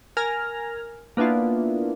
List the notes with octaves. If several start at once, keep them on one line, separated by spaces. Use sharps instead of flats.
A#4 G#5 F6 A#6
A#3 B3 D4 E4 F4